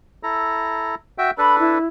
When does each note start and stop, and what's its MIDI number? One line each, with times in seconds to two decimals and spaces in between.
0.23 0.95 64
0.23 0.95 69
0.23 0.95 82
1.18 1.31 66
1.18 1.31 76
1.18 1.31 79
1.38 1.78 62
1.38 1.78 69
1.38 1.78 71
1.38 1.55 83
1.59 1.86 64